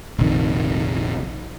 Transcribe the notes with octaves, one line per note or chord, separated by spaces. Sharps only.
F1 A#1 C3 D#3